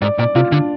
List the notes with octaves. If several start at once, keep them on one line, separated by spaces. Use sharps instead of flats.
G#2 D5
A#2 D5
C3 F4
D3 D4